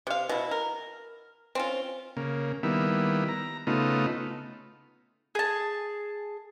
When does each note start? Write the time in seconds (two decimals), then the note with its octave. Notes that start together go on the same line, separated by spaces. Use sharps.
0.07 C3 F5
0.29 B2 E4
0.51 A#4
1.55 C4 C#4 F4
2.17 C#3 A#3
2.63 D#3 G3 A#3 B3 E4
3.29 A#5
3.67 C#3 A3 B3 D#4 F4
5.35 G#4 A5